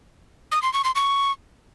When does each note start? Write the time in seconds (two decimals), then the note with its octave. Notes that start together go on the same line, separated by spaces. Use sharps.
0.52 D#6
0.63 C6
0.73 C#6
0.84 C6
0.95 C#6